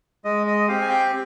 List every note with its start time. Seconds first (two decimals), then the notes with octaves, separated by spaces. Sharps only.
0.25 G#3 D#5
0.47 D#5
0.68 C4 G4 F5
0.81 G#5
0.89 G5